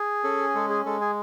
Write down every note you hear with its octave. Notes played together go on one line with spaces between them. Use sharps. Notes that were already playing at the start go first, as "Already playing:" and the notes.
Already playing: G#4
C#4 A4
G#3 A4
G#4
G#3 A4
G#4